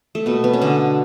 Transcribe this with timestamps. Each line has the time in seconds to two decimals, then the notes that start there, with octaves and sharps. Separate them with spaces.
0.15 A3
0.26 B2 B3
0.44 B3
0.53 C#4
0.62 D3 D4